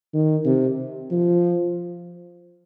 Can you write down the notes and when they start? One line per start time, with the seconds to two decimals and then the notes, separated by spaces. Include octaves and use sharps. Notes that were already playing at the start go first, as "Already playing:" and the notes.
0.14 D#3
0.46 C3
1.11 F3